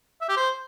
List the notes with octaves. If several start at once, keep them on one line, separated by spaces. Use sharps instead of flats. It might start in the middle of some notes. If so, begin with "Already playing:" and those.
E5
G4
C5